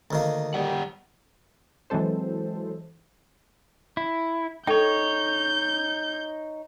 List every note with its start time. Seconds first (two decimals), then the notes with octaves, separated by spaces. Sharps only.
0.11 D2 D#3 A#3
0.54 G3 G4 D5 F#5
1.90 E3 F#3 G#3 C4 A4 C5
3.97 E4
4.67 D#4 A4 C#5 G5 G6